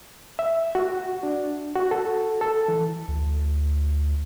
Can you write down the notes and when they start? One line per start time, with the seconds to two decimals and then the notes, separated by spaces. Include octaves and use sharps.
0.39 E5
0.75 F#4
1.23 D4
1.75 F#4
1.91 A4
2.41 A4
2.68 E3
3.08 D2